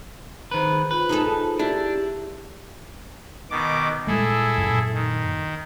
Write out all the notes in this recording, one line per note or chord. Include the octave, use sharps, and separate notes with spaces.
D#3 G#4 B4 C5 A#5
F4 B4 C5
D#4 G#4 A4
D4 E4 G4 G#4
B2 D#3 D6
A#2 G3 G#3 E4 G#4 A4
F#2 A#2
D#3